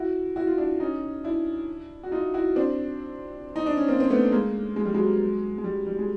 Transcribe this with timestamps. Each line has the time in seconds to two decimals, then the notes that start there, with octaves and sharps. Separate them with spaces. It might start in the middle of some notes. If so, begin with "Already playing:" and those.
Already playing: E4 F#4
0.36 E4 F#4
0.47 F4
0.58 D4 E4
0.80 C#4 D#4
1.24 D4 E4
2.03 F#4
2.12 D#4 F4
2.34 E4 F#4
2.56 C4 D4
3.56 D#4
3.66 D4
3.77 C#4
3.88 A#3 C4
4.00 C4
4.10 A3 B3
4.32 G#3 A#3
4.76 G#3
4.85 G3
4.94 F#3 G#3
5.58 G#3
5.64 G3
5.86 G3
5.99 G#3